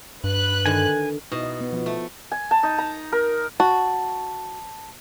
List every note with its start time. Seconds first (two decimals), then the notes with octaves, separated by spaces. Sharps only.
0.24 G2 B4 F#6
0.66 D3 D#3 G#5
1.32 B2 D#4 E4 D#5
1.44 D#5
1.61 B3
1.73 F3 B3
1.86 A3
2.32 G#5
2.51 A5
2.63 D#4
2.78 A#5
3.12 A#4
3.60 F#4 A5